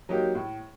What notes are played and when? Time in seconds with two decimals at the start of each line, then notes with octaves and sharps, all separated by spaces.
0.09 F#3 A#3 D#4 G4
0.35 A2